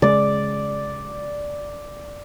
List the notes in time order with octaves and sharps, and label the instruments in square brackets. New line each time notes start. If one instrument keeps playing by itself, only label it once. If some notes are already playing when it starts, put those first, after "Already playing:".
[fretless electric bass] C#3 G#3 [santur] D5